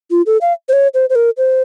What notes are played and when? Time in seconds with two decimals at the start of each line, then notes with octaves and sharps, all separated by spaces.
0.11 F4
0.26 A4
0.41 F5
0.69 C5
0.73 C#5
0.94 C5
1.10 C5
1.15 A#4
1.37 C5